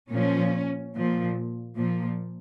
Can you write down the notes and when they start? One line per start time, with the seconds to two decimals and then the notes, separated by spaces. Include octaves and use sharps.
0.13 A#2 F3 C#4
0.95 A#2 F3
1.77 A#2 F3 A#3